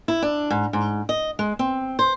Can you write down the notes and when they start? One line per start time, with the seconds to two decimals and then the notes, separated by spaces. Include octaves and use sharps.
0.08 E4
0.22 D4
0.50 G#2
0.73 G#2
1.09 D#5
1.39 G#3
1.59 C4
1.99 C5